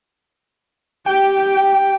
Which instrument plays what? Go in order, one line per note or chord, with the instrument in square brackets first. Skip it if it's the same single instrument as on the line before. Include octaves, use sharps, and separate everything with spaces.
[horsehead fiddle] G4 [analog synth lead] G5